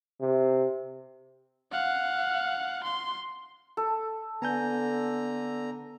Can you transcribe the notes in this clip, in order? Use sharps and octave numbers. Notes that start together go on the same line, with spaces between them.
C3
F5 F#5
C6
A4
D3 B3 G#5 A#5 G6